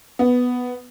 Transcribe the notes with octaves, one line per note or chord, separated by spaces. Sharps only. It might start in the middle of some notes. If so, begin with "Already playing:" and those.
B3